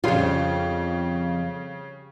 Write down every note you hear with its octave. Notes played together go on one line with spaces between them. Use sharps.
F2 C#3 G3 F4 F5